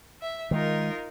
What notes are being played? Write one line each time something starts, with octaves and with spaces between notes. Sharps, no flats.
E5
D#3 G#3 D#4 F4 A#4